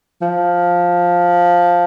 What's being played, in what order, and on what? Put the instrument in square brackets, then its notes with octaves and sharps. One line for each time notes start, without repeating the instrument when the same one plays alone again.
[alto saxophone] F3